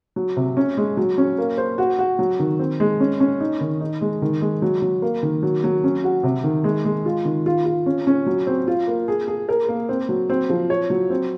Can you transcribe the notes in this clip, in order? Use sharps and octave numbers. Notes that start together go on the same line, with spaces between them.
F#3
C3
C#4
G#3
F#3
C#4
A#3
C5
F#4
F#4
F#3
D#3
C4
G#3
C#4
C#4
D#4
D#3
D#4
G#3
D#3
G#3
F#3
F#3
A#3
D#3
F#3
F#3
C#4
F#4
C3
D#3
G#3
G#3
F4
D#3
F4
F4
C#4
C#4
F#3
C4
F4
A#3
G#4
G#4
A#4
A#3
C4
F#3
C4
F3
C#5
F#3
C4